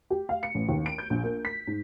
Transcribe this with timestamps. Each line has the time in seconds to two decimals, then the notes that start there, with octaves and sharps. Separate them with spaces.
0.10 G4
0.29 F5
0.43 C#7
0.55 A1
0.69 D#2
0.86 D7
0.98 G6
1.10 A#1
1.24 A#3
1.45 B6
1.67 G#2